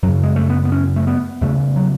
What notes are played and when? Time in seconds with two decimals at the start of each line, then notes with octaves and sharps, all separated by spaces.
0.03 F#2 F#3
0.08 C#3
0.23 G#3
0.36 A3
0.50 B3
0.65 B3
0.72 C#4
0.96 A3
1.07 B3
1.41 E2 C#3 A3
1.76 F#3